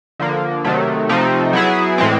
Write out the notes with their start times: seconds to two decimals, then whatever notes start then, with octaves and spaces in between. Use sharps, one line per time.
0.19 D3 F3 A#3
0.64 C3 D#3 F#3 A3
1.09 C3 F3 A3 C4 D#4
1.53 F#3 B3 E4 G#4
1.98 A2 E3 G#3 C4